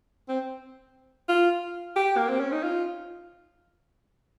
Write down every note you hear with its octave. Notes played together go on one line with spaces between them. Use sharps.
C4
F4
G4
A#3
C4
C#4
D#4
F4